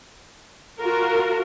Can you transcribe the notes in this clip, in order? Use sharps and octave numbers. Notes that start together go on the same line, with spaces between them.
F4 F#4 A#4